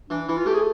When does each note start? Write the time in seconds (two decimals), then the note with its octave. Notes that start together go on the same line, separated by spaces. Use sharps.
0.10 E3 D4
0.28 E3 E4
0.37 F4
0.46 A3 G4
0.55 G#4